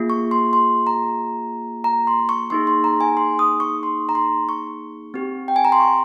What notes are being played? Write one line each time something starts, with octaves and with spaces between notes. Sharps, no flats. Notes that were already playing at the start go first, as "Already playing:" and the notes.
Already playing: A#3 F4 G#4
C#6
C6
C6
A#5
A#5
C6
C#6
A#3 D#4 G#4 C6
C6
A#5
G#5
C6
D#6
C#6
C6
A#5
C6
C#6
C4 G4
G5
G#5
A#5
C6
C#6